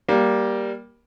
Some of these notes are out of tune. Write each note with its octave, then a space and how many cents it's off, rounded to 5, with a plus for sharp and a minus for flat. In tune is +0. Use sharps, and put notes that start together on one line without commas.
G3 +0 A#3 +15